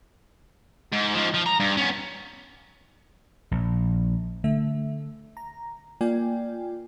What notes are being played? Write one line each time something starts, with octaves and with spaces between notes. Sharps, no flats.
G#2
G#2 F3
F3
A#5
G2
B3 C#4
A#1
D3 A3 E5
A#5
A#3 F4 D5 G5 G#5